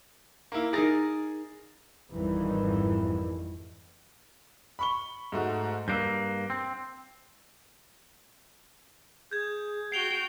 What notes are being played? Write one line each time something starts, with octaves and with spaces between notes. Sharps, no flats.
A#3 E4
D#4 G#4 A#4 A6 A#6 D7
G#1 F2 D#3 E3 G3
B5 C#6 G7
G#2 A3 F#4
G2 A#3 E6 F#6 G6
C4
G#4 G6 G#6
F#4 G5 C7 F7 G7